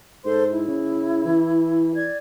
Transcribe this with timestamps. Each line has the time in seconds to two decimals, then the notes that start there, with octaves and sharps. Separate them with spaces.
0.25 G#2 A4 C5 C6
0.50 E4
0.67 C#3
1.25 E3
1.94 D5 G#6